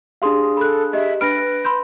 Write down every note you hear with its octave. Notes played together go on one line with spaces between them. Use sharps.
D4 G4 G#4 F5 C6
A4 B5 F#6
G4 D#5 E5
D4 B4 B5 F6 A#6 D7
B5 C6 G6